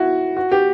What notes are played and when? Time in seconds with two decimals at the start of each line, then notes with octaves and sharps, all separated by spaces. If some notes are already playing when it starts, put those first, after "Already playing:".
Already playing: E4 F#4
0.37 F#4
0.52 G4